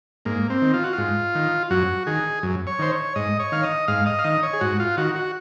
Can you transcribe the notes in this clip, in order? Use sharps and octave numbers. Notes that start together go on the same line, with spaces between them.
G#2 A#3
C4
D#3
F4
F#4
G#2 F4
D#3
F#2 F#4
D#3 G#4
F#2
C#5
D#3 C5
C#5
G#2 D#5
C#5
D#3 F5
D#5
G#2 F5
D#5
F5
D#3 D#5
C#5
G#4
G#2 F#4
F4
D#3 F#4
F#4